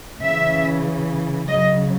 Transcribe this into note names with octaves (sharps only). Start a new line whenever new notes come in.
C#3 E3 E5
C#3 F#3 D#5